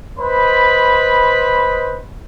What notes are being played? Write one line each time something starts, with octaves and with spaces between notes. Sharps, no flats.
B4 C5 D#5 B5